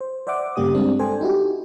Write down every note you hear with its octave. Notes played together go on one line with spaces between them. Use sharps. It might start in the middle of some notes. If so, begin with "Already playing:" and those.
C5
C5 D5 E5 F#5 D6
G2 C#3 A#3 G4 D5 D#6
G3 G#3 C4 D4 D5
A4 C5 G5 G#5
D#4 E4 F#4 G4